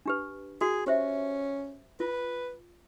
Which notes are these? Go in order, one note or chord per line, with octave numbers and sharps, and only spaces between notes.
D4 G4 B4
F#4 G#4
C#4 G4 C5 E5
F4 B4